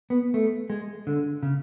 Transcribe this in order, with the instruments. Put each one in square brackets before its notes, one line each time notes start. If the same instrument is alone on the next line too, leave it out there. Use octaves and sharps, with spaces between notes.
[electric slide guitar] B3
A3
G#3
D3
C#3